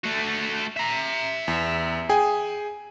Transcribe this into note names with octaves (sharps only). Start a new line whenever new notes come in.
A3 F#4
E5 A#5
E2
G#4 G5 G#5